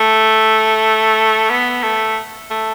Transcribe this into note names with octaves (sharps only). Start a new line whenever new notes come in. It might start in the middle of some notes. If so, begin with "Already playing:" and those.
Already playing: A3
B3
A3
A3